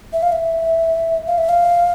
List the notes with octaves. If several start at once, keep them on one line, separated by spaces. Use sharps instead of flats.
E5
F5
E5
F5
E5
F5